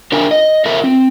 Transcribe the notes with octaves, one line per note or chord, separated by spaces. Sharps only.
D4 F4 A#4 E5 G5 G#5
D#5
A3 F4 A#4 E5
C4